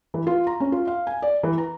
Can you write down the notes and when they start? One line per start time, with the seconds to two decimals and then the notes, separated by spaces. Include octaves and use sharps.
0.14 E3
0.27 F4
0.47 A#5
0.60 C#4
0.72 F4
0.87 F5
1.07 G#5
1.22 D5
1.43 E3
1.58 A#5